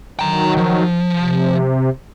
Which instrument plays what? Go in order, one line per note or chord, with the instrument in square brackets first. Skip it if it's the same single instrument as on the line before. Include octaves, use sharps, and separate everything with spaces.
[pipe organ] D#3 F#3 [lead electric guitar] G5 A#5
[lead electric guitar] F3
[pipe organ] C3